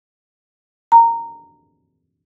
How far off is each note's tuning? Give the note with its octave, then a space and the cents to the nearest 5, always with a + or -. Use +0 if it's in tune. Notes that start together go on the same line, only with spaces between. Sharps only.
A#5 -15